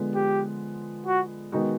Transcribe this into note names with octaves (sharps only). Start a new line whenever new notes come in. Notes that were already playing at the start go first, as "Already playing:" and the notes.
Already playing: D3 F3 G#3 B3
G4
F#4
D#3 G#3 B3 D#4 F#4